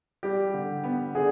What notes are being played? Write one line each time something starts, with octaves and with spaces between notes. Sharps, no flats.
G3 G4
D3
B3
D3 G#4